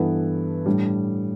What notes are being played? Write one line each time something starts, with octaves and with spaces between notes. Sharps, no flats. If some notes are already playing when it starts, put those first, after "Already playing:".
Already playing: G2 E3 B3 E4 A4
A2 G3 D4